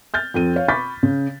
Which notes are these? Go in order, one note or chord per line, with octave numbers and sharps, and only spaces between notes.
F6 G6 A6
F2 C4 A4 D#7
C#5 F5
B5 C#6 D6 G6 A6 B6
C#3